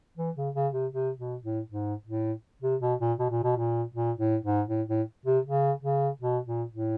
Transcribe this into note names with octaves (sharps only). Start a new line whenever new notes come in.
E3
C#3
C#3
C3
C3
B2
A2
G#2
A2
C3
B2
A#2
B2
A#2
B2
A#2
A#2
A2
G#2
A2
A2
C3
C#3
C#3
B2
A#2
A2